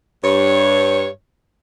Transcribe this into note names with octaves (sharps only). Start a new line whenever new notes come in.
G2 C#5